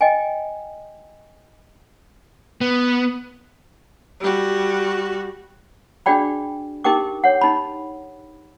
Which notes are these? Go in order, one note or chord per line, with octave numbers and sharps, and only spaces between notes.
D#5 G5 G#5
B3
G3 F#4
D4 F#4 G#4 D5 G5 B5
D#4 G4 A#4 G5 D6
C#5 F#5
D#4 B5